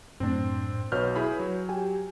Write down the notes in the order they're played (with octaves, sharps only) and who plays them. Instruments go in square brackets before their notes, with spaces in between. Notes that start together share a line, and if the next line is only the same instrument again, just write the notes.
[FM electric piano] F#2 A2 [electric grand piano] C4 D4
[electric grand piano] B1 F6 G6 [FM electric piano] F#4 B4 C#5
[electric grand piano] E4 G#4 B5
F#3
[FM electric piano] G4 G#5